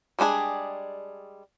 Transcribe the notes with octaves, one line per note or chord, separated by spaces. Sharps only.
G3 G#3 D4 G#4